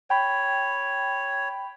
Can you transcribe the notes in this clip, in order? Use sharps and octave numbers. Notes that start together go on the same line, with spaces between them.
C#5 G5 B5